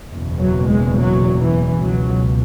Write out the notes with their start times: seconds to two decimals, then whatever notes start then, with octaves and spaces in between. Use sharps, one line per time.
0.11 F#1 E2 B2
0.40 F#3
0.68 G#3
0.97 F#3
1.40 E3
1.83 C#2 B2 F#3